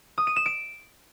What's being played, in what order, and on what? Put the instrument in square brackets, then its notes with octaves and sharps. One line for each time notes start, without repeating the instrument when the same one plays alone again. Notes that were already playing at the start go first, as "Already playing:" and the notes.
[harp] D#6
D#7
E7
D7